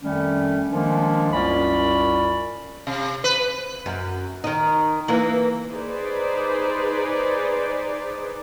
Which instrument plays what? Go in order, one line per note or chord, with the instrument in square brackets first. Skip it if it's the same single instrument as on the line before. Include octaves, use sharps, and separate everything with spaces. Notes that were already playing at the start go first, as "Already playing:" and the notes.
[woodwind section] F2 D#3 G3 A3 C#4
D#3 F3 G#3 A#3 C#4 D4
C2 F#2 C#4 F4 D5 B5
[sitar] C3
B4
[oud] F#2
D#3 D#4
E3 A#3
[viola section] D#4 G#4 B4 C5 D5